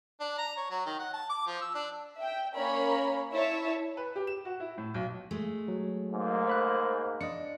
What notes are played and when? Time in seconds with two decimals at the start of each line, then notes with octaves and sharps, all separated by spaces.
0.20 D4
0.38 A#5
0.57 C#5
0.70 F#3
0.86 D#3
0.99 F#5
1.13 A5
1.29 D6
1.47 F3
1.61 E6
1.74 D4
2.16 E5 G5
2.55 A#3 C#4 A#4 C#5 B5
3.33 E4 C#5 E5 A5
3.97 B4
4.16 G4
4.27 E7
4.45 F#4
4.60 E4
4.78 A2
4.94 B1
5.31 G#3 A3
5.68 F#3
6.11 G#2 A#3
6.47 C5 B5 F#6
7.21 D4 D#5 C#7